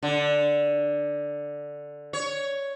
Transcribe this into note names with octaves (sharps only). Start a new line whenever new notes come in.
D3
C#5